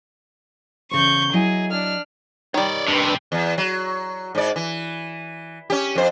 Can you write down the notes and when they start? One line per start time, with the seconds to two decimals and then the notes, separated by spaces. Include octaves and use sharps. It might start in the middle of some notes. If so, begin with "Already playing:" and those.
0.91 E2 C#3 C5 C#6 G6
1.34 F#3 E4 G#4 D#5
1.71 D4 F6
2.54 D#3 G3 C#5 D5
2.88 F2 A2 C3 D4 B4 C6
3.32 E2
3.58 F#3
4.35 G#2 D5
4.56 E3
5.70 C#4 G4
5.95 F2 C5